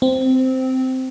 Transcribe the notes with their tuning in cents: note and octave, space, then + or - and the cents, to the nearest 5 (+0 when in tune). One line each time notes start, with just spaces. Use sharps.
C4 -10